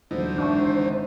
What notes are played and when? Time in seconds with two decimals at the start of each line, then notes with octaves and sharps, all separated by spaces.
0.11 D#1 D3 E3 F#3 D#4 C5
0.38 G#1 D4 E5 C#6